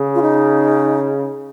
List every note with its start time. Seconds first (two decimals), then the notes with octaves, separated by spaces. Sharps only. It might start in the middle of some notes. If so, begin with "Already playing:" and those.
Already playing: C#3
0.15 F4
0.22 D#4